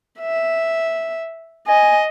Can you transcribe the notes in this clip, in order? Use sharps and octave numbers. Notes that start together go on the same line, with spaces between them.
E5
D#5 G#5